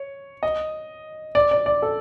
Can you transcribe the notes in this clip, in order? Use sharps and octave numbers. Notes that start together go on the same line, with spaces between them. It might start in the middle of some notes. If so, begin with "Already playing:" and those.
Already playing: C#5
D#5
D5
D5
D5
A4